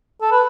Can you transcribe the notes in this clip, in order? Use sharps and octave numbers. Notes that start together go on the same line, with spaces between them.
A4
B4